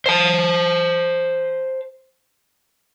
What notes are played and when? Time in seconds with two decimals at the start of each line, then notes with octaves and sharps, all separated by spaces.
0.06 C5 A5